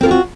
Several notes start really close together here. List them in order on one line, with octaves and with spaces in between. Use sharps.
C4 A#4 F4 G#4 F#4